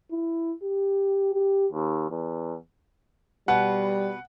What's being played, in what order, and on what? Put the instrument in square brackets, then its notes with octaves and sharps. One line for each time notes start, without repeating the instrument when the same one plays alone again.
[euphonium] E4
G4
G4
D#2
E2
[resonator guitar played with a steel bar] B2 B4 [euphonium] G3 [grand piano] F#5